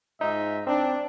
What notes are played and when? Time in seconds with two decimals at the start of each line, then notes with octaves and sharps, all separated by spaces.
0.21 G#2 D#4 F4 E5
0.67 C4 D4